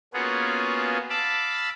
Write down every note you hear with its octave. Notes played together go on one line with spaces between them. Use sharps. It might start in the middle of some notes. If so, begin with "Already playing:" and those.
A#3 B3 C#4 F4 F#4 G#4
F5 A5 B5 D6 E6